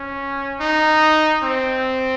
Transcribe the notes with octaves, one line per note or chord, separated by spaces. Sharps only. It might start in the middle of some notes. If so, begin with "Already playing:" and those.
Already playing: C#4
D#4
C4